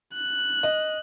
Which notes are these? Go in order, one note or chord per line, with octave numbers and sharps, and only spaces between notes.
F#6
D#5